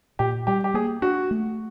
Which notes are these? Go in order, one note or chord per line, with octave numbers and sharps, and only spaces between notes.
A#2 G4
G3 G4
G4
A#3 G#4
D4 F#4
A3